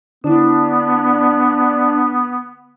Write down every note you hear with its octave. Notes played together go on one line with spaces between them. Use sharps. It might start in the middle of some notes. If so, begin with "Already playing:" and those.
D3 B3 D4 E4